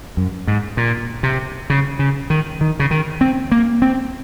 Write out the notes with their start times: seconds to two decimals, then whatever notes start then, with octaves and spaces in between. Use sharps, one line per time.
0.17 F#2
0.47 G#2
0.77 A#2
1.23 C3
1.70 C#3
1.99 C#3
2.30 D#3
2.61 D#3
2.80 C#3
2.91 D#3
3.21 C4
3.52 A#3
3.82 C4